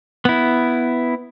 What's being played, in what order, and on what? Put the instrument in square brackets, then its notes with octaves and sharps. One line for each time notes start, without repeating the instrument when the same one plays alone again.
[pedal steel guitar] B3 E4